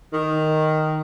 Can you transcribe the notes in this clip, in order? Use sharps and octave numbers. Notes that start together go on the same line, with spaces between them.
D#3